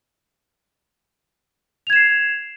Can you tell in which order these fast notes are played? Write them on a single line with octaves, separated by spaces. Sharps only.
F7 G#6 E7 C7